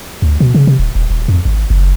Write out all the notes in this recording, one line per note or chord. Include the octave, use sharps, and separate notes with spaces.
D2
B2
C#3
C3
D1
D#1
D#1
F2
G#1
F#1